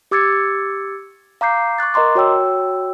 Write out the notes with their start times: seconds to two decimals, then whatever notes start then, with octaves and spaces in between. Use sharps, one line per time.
0.11 G4 D6 E6 G#6 A6 C#7
1.41 F5 A#5 D6 G6 C7
1.78 C#6 D6 F#6 A6
1.94 A#4 D#5 A#5 C6 D6
2.15 F#4 C#5 G5 E6